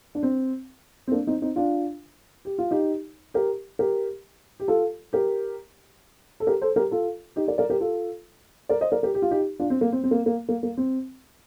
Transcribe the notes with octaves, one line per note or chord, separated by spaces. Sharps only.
D4
C4
C4
A#3 D4
C4 D#4
C4 D#4
D4 F4
G4
F4
D#4 G4
G4 A#4
G4 A#4
G4
F4 A4
G4 A#4
A4
G4 A#4
A4 C5
G4 A#4
F4 A4
D#4 G4
A#4 D5
A#4 D5
G4 A#4
F4 A4
A#4 D5
C5 D#5
A#4 D5
G4 A#4
G4
F4
D#4 G4
D4 F4
C4
A#3
C4
C4
A#3
A#3
A#3
A#3
C4